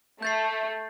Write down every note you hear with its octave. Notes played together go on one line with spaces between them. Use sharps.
A3 G6 A6 C7